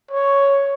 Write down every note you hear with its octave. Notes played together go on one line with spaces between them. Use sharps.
C#5